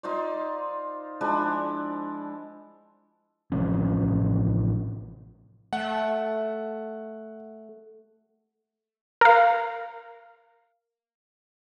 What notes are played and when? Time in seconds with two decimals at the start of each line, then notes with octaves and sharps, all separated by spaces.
0.03 D#4 F4 C5 D5
1.21 F3 G#3 D4 E4
3.52 A1 C3 F3 C#4
5.73 A3 F#5
9.21 A#4 F5